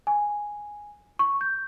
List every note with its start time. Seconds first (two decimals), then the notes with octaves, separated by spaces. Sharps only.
0.07 G#5
1.19 C#6
1.41 G6